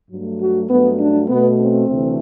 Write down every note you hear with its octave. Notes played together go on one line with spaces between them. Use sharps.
G2 F#3 A3
F#4
G2 F#3 A3 B3
D4
B2 A3 B3
C4
D2 C3 E3 A3